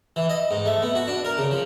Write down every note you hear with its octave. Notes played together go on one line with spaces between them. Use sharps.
E3
D#5
G#2
A3
B3
F#4
D4
A#4
C#3
F3